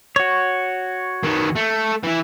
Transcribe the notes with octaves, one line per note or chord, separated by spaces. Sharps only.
F#4 C#5
D#3 B3
A3
E3 E4